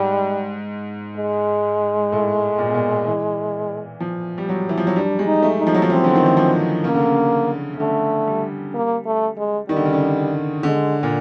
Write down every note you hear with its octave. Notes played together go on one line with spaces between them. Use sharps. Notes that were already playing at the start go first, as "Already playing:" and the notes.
Already playing: G#2 G3
G#3
A2
A#2
B2
A#2
E3
F3
G3
F#3
E3
F3
F#3
G3 D4
G#3
D#4
A3
D#4
F3
F#3
F3
E3 C4
D3
D#3
E3
F3
C#3 A#3
D3
C#3
C#3
D3 A3
G3
A#3
A3
G#3
D#3 G3
D3
C#3
D3
D3 G#3
A#2